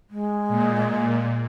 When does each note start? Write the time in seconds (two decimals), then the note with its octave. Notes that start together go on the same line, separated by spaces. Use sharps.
0.10 G#3
0.48 A#2